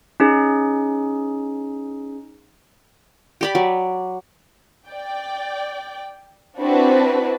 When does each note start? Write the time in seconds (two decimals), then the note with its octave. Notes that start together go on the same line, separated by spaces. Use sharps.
0.20 C#4 D#4 G#4
3.41 G4 D5 B5
3.55 F#3
4.88 D5 G5
6.59 C4 D4 E4 F#4 B4